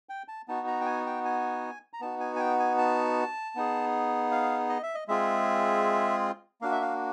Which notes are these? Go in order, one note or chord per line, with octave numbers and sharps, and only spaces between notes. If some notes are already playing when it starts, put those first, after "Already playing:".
G5
A5
B3 D#4 F#4 A5
A#5
G5
G#5
G5
G#5
A#5
B3 D#4 F#4 A5
G#5
G#5
G5
G#5
A5
B3 D#4 G#4
F5
D#5
E5
D#5
G#3 C4 F4 G#4 E5
A#3 D4 F#4 F5
E5
F5